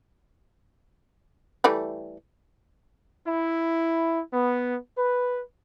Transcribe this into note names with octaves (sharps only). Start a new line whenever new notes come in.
E3 G3 A3
E4
B3
B4